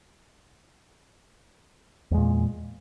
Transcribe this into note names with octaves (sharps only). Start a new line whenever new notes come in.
E2 A#2 G#3